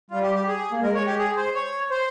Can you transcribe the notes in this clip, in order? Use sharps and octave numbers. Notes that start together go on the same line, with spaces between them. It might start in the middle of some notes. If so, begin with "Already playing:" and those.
G3 F4
G4
G4
G#4
A#3
G#3 A#4
C#5
G4
G#4
C5
C#5
C5